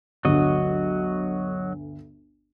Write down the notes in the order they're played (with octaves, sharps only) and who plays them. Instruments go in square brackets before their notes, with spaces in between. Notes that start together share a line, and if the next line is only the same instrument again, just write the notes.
[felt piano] G1 D2 [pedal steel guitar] F#3 F#4 D#5